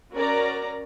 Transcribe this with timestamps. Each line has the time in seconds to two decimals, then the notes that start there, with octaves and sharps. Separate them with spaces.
0.13 C#4 F#4 A#4 D5 A#5